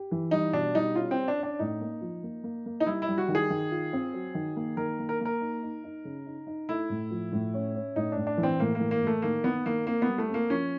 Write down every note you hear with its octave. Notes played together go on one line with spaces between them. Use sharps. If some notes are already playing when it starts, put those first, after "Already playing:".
Already playing: G4
E3
G3 D#4
B2 D4
G3 D#4
C#4 F4
C4
C#4
D4
C#4
D4
A2 D#4
A#3
F3
A#3
A#3
A#3
D#4
G3 E4
E4
G3
F#4
D#3
G#4
D#3
F4
C4
F#3
D#3
A#3
D#3 A#4
A#3
A#4
A#3
A#4
D#4
D#4
D#4
C#3
D#4
D#4
A3 E4
A2
F3
A2
C#4
C#4
A2 D#4
A2 D4
D4
E3
C4
A2 A#3
A#3
E3
A#3
A2
A3
D#3 A#3
D#3 B3
D#3 A#3
A#3 C4
B3
G3
A3
A#3 C4
F3 C#4